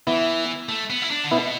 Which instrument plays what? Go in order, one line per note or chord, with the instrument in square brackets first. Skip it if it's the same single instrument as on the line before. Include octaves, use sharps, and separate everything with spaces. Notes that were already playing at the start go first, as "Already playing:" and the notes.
[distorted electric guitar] E3 [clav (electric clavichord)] B3 E4
[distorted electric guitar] A3
B3
E4
D4
D3
[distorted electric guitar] B2 [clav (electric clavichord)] B3 E4